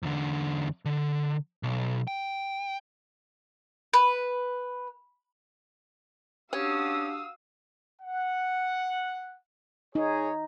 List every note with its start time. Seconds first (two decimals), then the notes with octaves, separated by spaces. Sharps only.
0.02 E2 D3
0.85 D3
1.63 B1
2.07 G5
3.93 B4
6.53 C#4 D4 F#4 G4 F5 D#6 E6
8.02 F#5
9.95 D#4 G#4 C#5